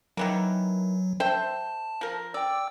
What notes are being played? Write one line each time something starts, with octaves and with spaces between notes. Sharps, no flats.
D#3 E3 F#3 A#3
C5 E5 G5 A5
F3 A#4
D5 G5 E6